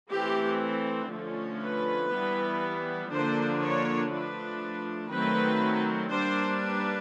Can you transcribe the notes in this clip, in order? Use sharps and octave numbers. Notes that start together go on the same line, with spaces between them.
E3 A3 C4 G4
D3 F3 A3 C#4
B4
E3 G3 B3
D3 F3 A#3 D4 C5
C#5
F3 A3 D4 B4
D#3 F#3 A3 C4 B4
G3 A#3 D4 C5
B4